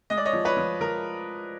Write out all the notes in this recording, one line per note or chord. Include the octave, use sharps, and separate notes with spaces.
G#3 D#5
D5
C#5 D#5
F3
B4 C#5
F3
F3 A#4